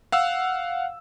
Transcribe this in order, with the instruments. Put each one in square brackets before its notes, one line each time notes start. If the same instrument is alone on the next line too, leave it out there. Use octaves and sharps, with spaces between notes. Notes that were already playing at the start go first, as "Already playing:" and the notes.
[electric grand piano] F5 F#5 E6